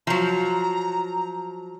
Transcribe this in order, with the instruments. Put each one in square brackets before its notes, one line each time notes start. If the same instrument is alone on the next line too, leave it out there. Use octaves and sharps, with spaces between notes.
[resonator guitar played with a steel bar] F3 F#3 [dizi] A#5